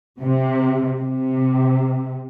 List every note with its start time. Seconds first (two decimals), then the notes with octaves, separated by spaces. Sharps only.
0.20 C3
1.00 C3